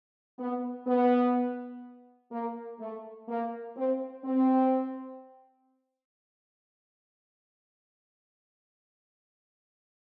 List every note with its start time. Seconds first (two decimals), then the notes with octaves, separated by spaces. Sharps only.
0.39 B3
0.87 B3
2.32 A#3
2.80 A3
3.28 A#3
3.76 C4
4.25 C4